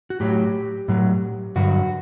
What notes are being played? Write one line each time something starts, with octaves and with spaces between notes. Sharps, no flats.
F#4
A2 F#3 G4
A2 F#3
G2 D3 F#3 F#4